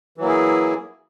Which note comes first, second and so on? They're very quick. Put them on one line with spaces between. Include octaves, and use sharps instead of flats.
E3 F#3 A#3 E4 G#4